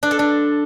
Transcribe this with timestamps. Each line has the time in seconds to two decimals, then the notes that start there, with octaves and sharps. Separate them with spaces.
0.03 D4
0.11 A4
0.19 D4